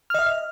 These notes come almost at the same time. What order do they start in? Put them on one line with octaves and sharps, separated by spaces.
F6 D#5 E5